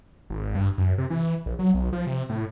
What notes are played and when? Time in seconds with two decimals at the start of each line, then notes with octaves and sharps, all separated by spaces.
0.30 G#1
0.55 G2
0.78 F#2
0.98 C3
1.10 E3
1.46 A#1
1.59 F#3
1.74 B1
1.93 F3
2.07 C3
2.29 A2